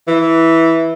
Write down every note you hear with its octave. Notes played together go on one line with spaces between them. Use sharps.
E3